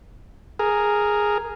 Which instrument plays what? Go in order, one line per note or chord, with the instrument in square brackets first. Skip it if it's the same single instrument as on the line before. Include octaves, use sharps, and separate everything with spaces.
[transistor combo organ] G#4 A#4